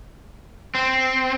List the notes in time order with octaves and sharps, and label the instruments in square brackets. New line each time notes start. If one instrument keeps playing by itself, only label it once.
[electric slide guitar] C4